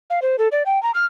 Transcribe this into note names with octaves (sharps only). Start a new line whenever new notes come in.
F5
C5
A4
D5
G5
A#5
F6